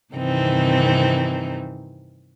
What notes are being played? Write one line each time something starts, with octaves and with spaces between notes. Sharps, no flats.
G2 C3 D#3 E3 C4 D#4